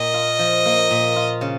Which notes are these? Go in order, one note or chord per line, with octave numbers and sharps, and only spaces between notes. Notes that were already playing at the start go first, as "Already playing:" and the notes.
Already playing: A#2 D#5
F4
F3
A#3
A#2
F4
C#3